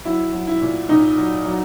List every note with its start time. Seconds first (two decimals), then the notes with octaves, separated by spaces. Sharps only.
0.05 F#3 E4
0.33 F#3
0.47 E4
0.61 A#2
0.89 A#2 D#4
1.17 F#3
1.46 F#3